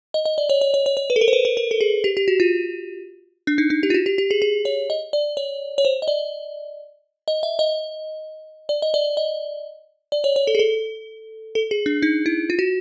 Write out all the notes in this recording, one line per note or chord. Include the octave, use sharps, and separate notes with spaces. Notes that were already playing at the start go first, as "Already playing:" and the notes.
D#5
D#5
D5
C#5
C#5
C#5
C#5
C#5
B4
A4
A#4
C5
B4
A#4
A#4
A4
G#4
G4
G4
F#4
F4
D4
D#4
D#4
G4
F4
F#4
G4
G4
G#4
G#4
C#5
D#5
D5
C#5
C#5
C5
D#5
D5
D#5
E5
D#5
D5
D#5
D5
D#5
D5
C#5
C#5
A4
G#4
A4
A4
G#4
D4
D#4
E4
F4
F#4